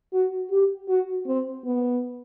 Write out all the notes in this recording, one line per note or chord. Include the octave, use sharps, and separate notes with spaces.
F#4
G4
F#4
C4
B3